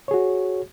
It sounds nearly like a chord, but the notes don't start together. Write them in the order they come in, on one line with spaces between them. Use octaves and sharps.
C#5 G#4 F#4